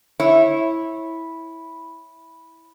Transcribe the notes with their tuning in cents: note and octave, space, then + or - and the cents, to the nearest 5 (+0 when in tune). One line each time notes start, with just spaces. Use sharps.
E4 -10 C#5 -30